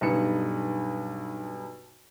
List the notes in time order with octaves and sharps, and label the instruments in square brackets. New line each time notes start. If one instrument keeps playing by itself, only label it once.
[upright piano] B1 G2 D#4 B4 C#7